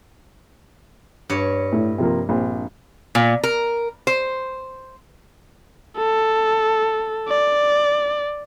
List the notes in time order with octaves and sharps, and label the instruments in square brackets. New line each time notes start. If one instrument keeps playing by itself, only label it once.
[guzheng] G2 C#5
[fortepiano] A2
C3 F3 A#3
A#1 C4
[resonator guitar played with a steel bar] A#2
A#4
C5
[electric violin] A4
D5